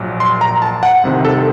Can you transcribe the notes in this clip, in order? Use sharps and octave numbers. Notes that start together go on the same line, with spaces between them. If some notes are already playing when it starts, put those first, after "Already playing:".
Already playing: A#1 A#2 F#3
C6
A#5
A5
F#5
C2 C3 D#3
A4